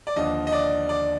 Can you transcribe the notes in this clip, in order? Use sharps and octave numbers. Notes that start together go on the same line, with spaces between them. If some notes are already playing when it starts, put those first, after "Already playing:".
D5
D#2 D3 F3 D#5
D#5
D5
D5